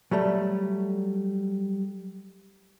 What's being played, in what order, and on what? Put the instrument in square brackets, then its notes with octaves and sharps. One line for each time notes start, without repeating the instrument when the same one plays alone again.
[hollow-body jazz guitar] F#3 G3 A3